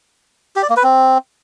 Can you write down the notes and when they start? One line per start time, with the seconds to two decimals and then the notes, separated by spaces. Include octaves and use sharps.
0.56 G4
0.63 D5
0.70 A#3
0.76 B4
0.83 C4